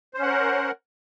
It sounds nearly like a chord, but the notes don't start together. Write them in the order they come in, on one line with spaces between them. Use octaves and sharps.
C5 C#4 F#5 A#4